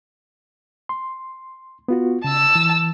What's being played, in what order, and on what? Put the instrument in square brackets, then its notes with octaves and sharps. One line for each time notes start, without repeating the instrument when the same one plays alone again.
[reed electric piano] C6
B3 F4 F#4
[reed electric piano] C#3 [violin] A5 E6
[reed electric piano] E3